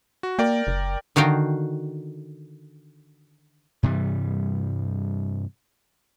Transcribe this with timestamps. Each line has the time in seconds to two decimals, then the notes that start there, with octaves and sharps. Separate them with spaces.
0.23 F#4
0.39 A#3 A#4 D5 G5
0.67 F#1
1.16 D3 D#3 F#4 F5 G5
3.83 G2 C3 E3 G3